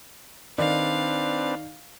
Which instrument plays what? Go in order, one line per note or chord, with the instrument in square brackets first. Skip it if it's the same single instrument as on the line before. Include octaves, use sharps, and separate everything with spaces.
[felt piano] D#3 D5 [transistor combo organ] C4 D4 B4 [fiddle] F5